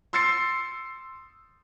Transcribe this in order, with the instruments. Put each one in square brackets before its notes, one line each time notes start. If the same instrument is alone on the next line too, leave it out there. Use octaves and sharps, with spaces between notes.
[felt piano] C6 E6 A6 C7 C#7